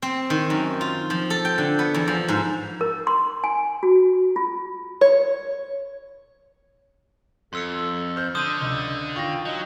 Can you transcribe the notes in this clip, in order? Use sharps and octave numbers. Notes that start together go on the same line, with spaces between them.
C4
D#3
F#2
F4
F3
A4
G5
D3
B3
E2
F3
G#2
A#4
C6
G#5
F#4
F4
C#5
F2 A4 C6 E6 C#7
C5 F6 G6
D3 C6 D#6 G6 D#7
C#2 D#5
D#3 F4 G5 C#6 A#6
F#3 D#5 G6